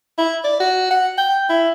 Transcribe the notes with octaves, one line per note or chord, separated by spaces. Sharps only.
E4
D5
F#4
F#5
G5
E4